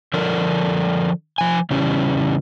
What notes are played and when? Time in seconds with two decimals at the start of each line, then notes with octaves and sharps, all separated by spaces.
0.14 D3 F3 D4 A4 A#4
1.38 F3 G#5
1.71 C#3 E3 G3 C#4